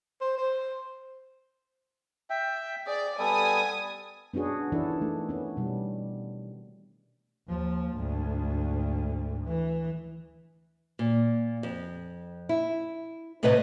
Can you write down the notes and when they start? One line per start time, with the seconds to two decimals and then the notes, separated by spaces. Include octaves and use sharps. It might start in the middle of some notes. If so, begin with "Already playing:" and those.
0.21 C5
0.38 C5
2.30 E5 G5
2.87 G#4 D5
3.19 G3 B3 A4 G#5 D#6
4.34 B3 C#4 D4 F#4 G#4
4.72 D#3 E3 D4 E4 A4
5.02 A3
5.29 B3 C#4
5.57 B2 G3
7.48 D#2 F3
7.96 D2 G#2
9.45 E3
10.99 A#2
11.63 F2
12.49 E4
13.43 A2 C3 A3 B4 C#5 D#5